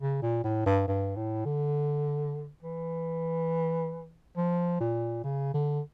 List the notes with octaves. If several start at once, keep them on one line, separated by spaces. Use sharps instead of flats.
C#3
A#2
A2
G2
G2
A2
D3
E3
F3
A#2
C#3
D3